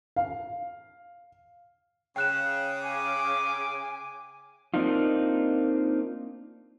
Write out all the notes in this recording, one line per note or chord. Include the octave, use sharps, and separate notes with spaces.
F5
C#3 G5 F#6 E7
G#5 D6
A#3 C4 D4 D#4 F4